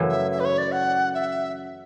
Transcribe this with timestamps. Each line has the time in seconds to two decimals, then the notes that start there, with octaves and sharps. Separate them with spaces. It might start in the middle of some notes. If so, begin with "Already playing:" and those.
Already playing: F#2 C#3 E3 A3
0.10 E5
0.32 E5
0.40 B4
0.45 C#5
0.58 D5
0.72 F#5
1.15 E5